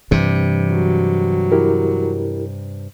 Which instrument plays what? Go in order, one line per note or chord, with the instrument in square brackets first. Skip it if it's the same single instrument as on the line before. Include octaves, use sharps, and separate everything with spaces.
[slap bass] G2 C3 [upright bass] E3
[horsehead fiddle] F#3
[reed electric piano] E4 G4 A#4